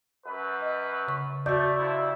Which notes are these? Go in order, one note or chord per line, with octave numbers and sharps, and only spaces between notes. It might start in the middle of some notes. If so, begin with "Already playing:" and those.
F#2 B4
D#5
C#3 C#6
A3 F#4 D5 G6
F2 C3 E4